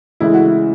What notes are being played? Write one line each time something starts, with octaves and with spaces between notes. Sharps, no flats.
D2 C#3 E3 G#3 E4
F#4
E4